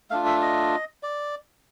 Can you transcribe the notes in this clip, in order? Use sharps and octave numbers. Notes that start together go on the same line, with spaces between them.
A3 D4 F4 F5
E5
D#5
D5